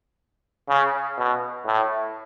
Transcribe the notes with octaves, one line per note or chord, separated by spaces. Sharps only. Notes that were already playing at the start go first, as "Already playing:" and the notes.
C#3
B2
A2